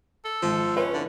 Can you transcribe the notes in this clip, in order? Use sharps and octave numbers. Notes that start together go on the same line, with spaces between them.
A4
G#1 F3
C#4 B4
D3 E4